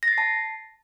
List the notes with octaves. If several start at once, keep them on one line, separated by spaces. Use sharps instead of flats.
A#6
A6
C7
A5